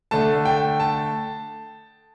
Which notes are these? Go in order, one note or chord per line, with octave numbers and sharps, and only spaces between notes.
D3 A3 A5
G5
A5